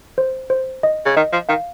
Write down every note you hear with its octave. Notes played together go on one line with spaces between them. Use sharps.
C5
C5
D#5
C#3
D#3 D#5
F3
D#3 F5